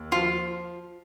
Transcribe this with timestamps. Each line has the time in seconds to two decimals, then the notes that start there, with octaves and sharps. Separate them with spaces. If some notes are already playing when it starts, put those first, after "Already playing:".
Already playing: D#2
0.12 F3 F4